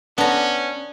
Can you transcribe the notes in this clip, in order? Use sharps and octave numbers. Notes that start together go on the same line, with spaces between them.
B3 C#4 D4 A#5